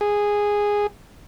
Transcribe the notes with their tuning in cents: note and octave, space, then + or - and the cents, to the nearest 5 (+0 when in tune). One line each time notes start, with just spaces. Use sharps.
G#4 -10